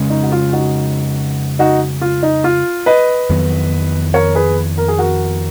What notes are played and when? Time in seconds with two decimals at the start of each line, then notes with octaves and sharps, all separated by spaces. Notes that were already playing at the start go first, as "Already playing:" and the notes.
Already playing: F2 C#3 G#3 C#4
0.10 D#4
0.23 F#4
0.32 F4
0.53 D#4 F#4
1.59 D#4 F#4
2.01 F4
2.23 D#4
2.44 F4
2.86 B4 D#5
3.29 F2 D#3 F#3 B3
4.14 A#4 C#5
4.35 G#4 B4
4.78 A#4
4.88 G#4
4.98 F#4 A#4